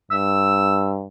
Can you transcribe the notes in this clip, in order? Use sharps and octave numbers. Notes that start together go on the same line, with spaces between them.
G2 E6